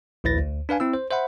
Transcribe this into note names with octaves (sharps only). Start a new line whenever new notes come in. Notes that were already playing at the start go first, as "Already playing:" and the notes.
A#1 D#2 E4 B4 A6 A#6
D2
D4 B4 F5 G#5
C4 E4 E6
C5
C5 E5 F#5 B5